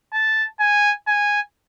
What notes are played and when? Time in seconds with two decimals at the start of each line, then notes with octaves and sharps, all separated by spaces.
0.13 A5
0.60 G#5
1.08 G#5